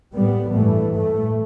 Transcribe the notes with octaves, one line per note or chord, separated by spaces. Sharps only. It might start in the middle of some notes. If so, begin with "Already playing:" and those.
A2 G3 B3
G2 E3 A3
A2 A3